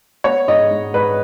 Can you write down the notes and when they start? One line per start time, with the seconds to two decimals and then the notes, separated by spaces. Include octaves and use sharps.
0.24 B3 C#5
0.47 G#2 D#5
0.71 G#2
0.94 G#2 B4